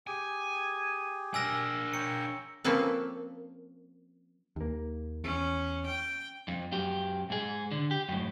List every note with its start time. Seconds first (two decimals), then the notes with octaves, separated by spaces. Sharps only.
0.07 G4 G#4 G#5
1.34 D4 A#4 G#5 E6 A#6
1.94 C#5 G5 A#5 C#7
2.64 F3 A#3 C4 C#4 A4 B4
4.56 D#2 A#3
5.24 E2 C#4
5.86 G5
6.48 F2
6.72 F#2 G4
7.30 G#2 G#4
7.71 D3
7.91 G4
8.09 F#2 A2